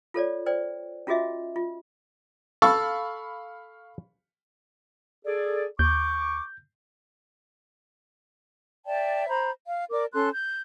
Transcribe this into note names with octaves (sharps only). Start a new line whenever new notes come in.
F4 A4 C#5 D5
C5 D5 G5
C#4 F4 F#4 G#4 D#5 E5
F4
A4 F5 B5 C#6
G#4 A4 D5
D#2 C#6 D6 G6
D5 E5 G5 A5
C5 A#5 B5
F5
A#4 D5 D6
C#4 A4 C6 F#6
G6